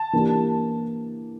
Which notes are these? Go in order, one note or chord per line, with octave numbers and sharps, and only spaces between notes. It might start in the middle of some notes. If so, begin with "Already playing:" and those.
Already playing: A5
E3 A#3 D4 G4